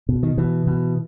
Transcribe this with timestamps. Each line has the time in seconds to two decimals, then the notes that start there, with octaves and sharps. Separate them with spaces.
0.09 B2
0.23 D#3
0.37 B2 E3
0.67 B2